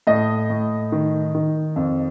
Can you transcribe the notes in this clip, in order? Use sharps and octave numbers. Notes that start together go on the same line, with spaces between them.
A2 D#5
A2
D#3
D#3
F2